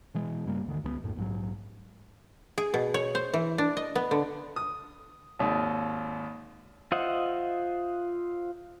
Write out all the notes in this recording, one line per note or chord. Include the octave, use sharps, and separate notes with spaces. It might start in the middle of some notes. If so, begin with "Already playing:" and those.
B2 E3 G#3
G2 C#3 G3 A#3
D2 D3 D#3
C#2 G3 B3
D#1 F#2 A2
A#1 G#2 F#3
G#4
B2
C#5
C5
E3
D4
D#5
B3
D3
D#6
G#1 D#2
F4 C5 D#5 E5 F#5